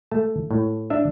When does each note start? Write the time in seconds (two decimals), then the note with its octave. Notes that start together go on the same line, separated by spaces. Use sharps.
0.11 A3 A5
0.51 A2
0.90 D4 E5